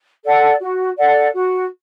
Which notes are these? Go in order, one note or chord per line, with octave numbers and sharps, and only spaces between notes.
A4 D5 F#5
F#4
A4 D5 F#5
F#4